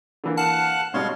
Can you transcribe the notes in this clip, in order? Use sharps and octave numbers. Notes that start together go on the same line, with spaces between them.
D3 E3 A#3
F5 F#5 A5 F#6
G#2 B2 G3 C#5 F5 C6